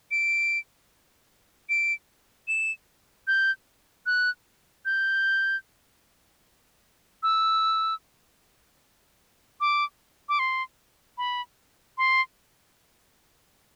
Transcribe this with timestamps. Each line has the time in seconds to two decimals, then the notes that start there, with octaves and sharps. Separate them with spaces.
0.11 D7
1.69 D7
2.48 E7
3.27 G6
4.06 F#6
4.85 G6
7.23 E6
9.61 D6
10.29 D6
10.39 C6
11.18 B5
11.98 C6